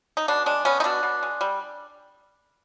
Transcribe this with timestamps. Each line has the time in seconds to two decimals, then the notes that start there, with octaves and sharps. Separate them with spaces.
0.17 D#4
0.28 B2 D4
0.46 G#3 D4
0.65 B3 C#4
0.80 D#4
0.84 B2 D4
1.03 B2
1.23 G#3
1.41 G3